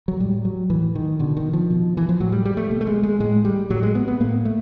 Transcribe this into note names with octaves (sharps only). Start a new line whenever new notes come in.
F#3
A2 G3
F#3
A2 E3
D#3
B2 D3
D#3
F3
B2
E3
F3
A2 F#3
G3
G3
A3
B2 A3
A3
G#3
G#3
A2 G#3
G3
A2 F#3
G#3
B3
B3
A2 A#3
A3